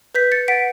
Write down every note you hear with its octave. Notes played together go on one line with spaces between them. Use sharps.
B4 G6 B6
A6 C#7
F#5 B6 D7